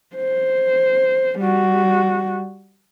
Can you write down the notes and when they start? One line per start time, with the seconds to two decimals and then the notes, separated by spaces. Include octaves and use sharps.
0.15 C5
1.40 G3 F#4